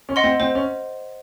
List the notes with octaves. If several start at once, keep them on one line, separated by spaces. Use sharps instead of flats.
C#4
D#5 F#5 C6
C4
C4 C5
C#4